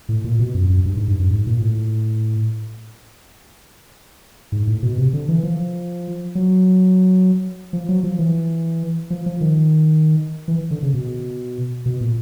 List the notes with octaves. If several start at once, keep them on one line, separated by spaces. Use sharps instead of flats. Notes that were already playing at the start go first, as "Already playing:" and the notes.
A2
A#2
B2
F#2
F#2
G2
G#2
G2
F#2
G#2
A#2
A2
G#2
A2
B2
C3
D3
E3
F3
F#3
F3
F#3
F3
E3
F3
F3
D#3
E3
D3
C#3
B2
B2
A#2